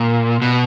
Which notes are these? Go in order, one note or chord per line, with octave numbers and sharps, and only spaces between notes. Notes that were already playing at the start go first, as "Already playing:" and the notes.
Already playing: A#2
B2